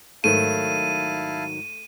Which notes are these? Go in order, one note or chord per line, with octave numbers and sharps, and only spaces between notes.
G#2 D#3 F#3 A3 E4 F5 A5 D#7